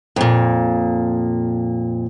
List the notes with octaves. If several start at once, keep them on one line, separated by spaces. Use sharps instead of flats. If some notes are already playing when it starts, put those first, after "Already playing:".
F2 A#2